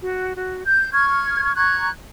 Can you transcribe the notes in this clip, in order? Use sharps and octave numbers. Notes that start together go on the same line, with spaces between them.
F#4
F#4
G6
C#6 F6 G#6
A#5 C#6 F#6 G#6